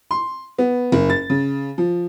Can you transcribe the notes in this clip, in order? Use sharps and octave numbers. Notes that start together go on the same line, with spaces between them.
C6
B3
F#1
A6
C#3
F3